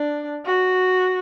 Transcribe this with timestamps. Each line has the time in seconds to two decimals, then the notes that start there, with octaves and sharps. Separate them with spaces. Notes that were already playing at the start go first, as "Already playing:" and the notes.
Already playing: D4
0.45 F#4